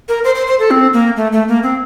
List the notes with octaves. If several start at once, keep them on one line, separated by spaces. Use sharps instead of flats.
A#4
C5
C5
C5
A4
C4
A#3
A3
A3
A#3
C4